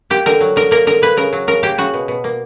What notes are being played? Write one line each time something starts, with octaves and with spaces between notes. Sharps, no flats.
A#3 G4
D3 A#4
F#3
D3 A#4
A#3 A#4
D3 A#4
A#3 B4
C#3 A#4
F#3
C#3 A#4
A#3 G4
C#3 F#4
B2
B2
A#3